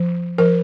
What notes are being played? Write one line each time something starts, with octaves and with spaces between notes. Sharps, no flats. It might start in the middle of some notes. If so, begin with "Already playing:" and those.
Already playing: F3
F3 A#4